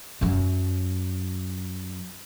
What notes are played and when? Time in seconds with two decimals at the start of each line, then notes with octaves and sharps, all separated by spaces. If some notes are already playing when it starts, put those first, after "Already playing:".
0.21 F#2 F#3